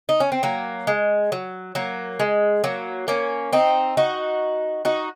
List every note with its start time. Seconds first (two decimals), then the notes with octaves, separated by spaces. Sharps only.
0.09 D#4
0.20 C#4
0.32 C4
0.43 F#3 A#3
0.87 G#3
1.32 F#3
1.75 F#3 A#3
2.20 G#3
2.64 F#3 A#3
3.08 A#3 C#4
3.53 C4 D#4
3.97 D#4 F#4
4.85 D#4 F#4